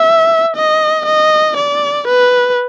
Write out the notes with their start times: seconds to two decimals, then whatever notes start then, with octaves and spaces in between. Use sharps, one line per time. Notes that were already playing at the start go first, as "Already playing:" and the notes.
Already playing: E5
0.56 D#5
1.06 D#5
1.57 D5
2.08 B4